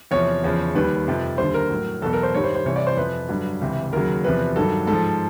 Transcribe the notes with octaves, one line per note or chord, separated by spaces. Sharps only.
E2 C3 F3 C#5
E2 C#3 F3
D#2 D#3 G3 B4
F2 C3 F3
D#2 D3 G3 C5
A#4
A2 F#3
E2 B2 F#3 A4
A#4
C5
G2 D#3 G3 C#5
C5
C5
C2 C3 E3 C#5
D5
C5
F2 C3 F3 B4
G2 D3 F#3
C#2 C3 E3
D#2 C#3 F#3 A#4
E2 C3 F3 B4
G2 D#3 F#3 A4
G#2 A4
F3